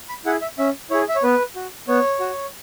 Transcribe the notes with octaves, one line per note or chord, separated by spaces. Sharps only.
B5
E4 G#4 F#5
E5
C#4 E5
E4 G#4 C#5
E5
C#5
B3 B4
F#4
B3 C#5
F#4